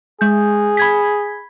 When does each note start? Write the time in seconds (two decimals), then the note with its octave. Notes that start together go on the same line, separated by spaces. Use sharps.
0.21 G#3 G#4 G6
0.77 B5 G#6 B6